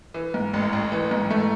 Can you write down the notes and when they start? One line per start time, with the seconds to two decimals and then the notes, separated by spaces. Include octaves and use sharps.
0.14 E3
0.34 G#2
0.54 A1
0.73 A1
0.92 E3
1.11 G#2
1.30 A3